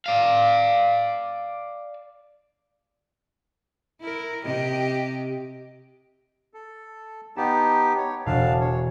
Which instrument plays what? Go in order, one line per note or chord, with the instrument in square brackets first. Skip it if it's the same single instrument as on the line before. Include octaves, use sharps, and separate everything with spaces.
[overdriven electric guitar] D5 F5
[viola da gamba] E4 A#4
C3 G4 D#5
[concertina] A4
[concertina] B3 D#4 G4 [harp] F#5 A5
[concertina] C#5
[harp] E1 B2 [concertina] D4 F5
[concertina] C#5